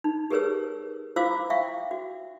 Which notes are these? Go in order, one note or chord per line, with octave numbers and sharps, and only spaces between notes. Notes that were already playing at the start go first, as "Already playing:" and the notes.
D#4
G4 G#4 A#4 B4 C#5 E6
E4 F4 C5 F5 D6 E6
E5 F5 G5 C#6
F#4